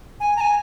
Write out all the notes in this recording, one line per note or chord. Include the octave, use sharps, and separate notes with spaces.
G#5
A#5
G#5